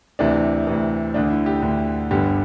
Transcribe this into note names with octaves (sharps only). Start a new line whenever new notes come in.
D2 C3 E3 D4
D2 C3 E3
D2 D3 D4
E4
G4
D2 D3
G1 G2 D3 G4